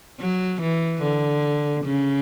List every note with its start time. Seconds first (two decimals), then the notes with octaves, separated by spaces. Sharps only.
0.21 F#3
0.62 E3
1.03 D3
1.85 C#3